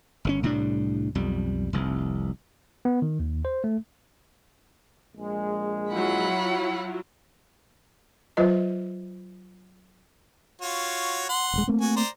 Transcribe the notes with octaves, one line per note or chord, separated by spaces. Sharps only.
G1 D3 C#4
C2 A2 G3 D4
B1 F2 G3
F1 C2
B3
D#3
D#2
C5
A3
A#1 G#3
F#3 E4 F4 F#5 B5
F#3 F4 B4 C5 D#5
F4 F#4 C#5
F#5 C6
D#1 G#3
A3 A#3 C4
F#4 G#5
C5 D5 A#5